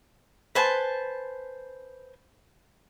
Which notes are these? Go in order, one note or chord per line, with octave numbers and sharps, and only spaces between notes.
B4 C5 G#5 A5